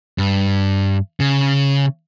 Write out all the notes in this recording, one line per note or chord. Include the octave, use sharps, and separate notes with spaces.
G2
C#3